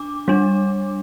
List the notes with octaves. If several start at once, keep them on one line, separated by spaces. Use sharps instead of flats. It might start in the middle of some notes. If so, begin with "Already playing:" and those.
Already playing: D4 D6
G3 D4